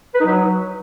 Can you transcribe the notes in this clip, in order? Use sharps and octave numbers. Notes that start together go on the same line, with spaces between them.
B4
D#4
F#3